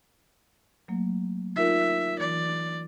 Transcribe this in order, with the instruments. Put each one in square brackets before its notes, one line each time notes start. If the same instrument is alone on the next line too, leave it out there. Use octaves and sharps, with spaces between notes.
[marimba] F#3 A3 A#3
[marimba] D#4 F4 A#4 [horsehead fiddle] E5
[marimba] E3 [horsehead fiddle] D5